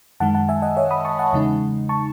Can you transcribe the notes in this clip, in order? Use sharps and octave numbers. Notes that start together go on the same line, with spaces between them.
F#2 D#3 G#3 F#5 A5
F#5 A5
E5 G#5
D#5 F#5
C#5 E5
B5 D#6
A5 C#6
F#5 A5
E2 C#3 G#3 D#4
A5 C#6